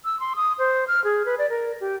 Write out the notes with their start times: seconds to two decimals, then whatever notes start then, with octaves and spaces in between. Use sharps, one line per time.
0.05 E6
0.20 C6
0.36 D#6
0.59 C5
0.88 F6
1.04 G#4
1.25 B4
1.38 D5
1.50 A#4
1.81 G4